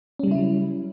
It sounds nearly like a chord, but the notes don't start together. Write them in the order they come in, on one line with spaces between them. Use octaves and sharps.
C#4 G3 C#3 E4 F#3